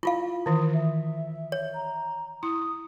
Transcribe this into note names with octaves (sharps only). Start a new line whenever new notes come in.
E4 F4 F5
D#3 E3 D#6
E5
C#5
A#5
E4 D#6